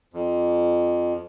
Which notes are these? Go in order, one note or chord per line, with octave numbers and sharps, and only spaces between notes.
F2